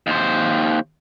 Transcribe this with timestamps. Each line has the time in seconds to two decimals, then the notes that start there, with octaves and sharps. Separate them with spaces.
0.07 D#2 C5